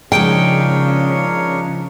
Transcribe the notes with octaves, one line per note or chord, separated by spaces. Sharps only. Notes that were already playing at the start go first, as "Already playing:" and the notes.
C#3 F3 G#3 D4 D#4 A#4 C#5 G5